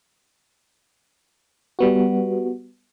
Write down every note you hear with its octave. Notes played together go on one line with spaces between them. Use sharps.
G3 B3 F#4